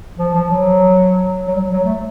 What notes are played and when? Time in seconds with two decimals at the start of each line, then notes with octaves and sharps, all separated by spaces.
0.19 F3
0.35 F3
0.50 F#3
1.48 F#3
1.55 G3
1.60 F#3
1.72 F#3
1.85 A3